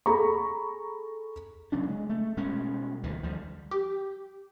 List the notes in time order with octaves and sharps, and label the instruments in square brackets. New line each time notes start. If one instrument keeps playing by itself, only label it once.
[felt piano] G#4 A4 A#5 B5 C#6
[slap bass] C#3 F#3 C#4 D4
G#3
A3
B2 G3 G#3 C#4
D2 D#3 E3
D2 F3 G3
[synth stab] G4